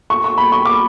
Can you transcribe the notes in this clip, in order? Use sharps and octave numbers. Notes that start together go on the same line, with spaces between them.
C#6
C#6
B5
C#6
D6